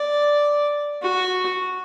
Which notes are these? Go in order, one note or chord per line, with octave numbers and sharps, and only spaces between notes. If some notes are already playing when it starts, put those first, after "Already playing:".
Already playing: D5
F#4